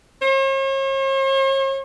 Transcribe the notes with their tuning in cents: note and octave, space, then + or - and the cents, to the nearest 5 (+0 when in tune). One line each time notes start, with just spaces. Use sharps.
C#5 -45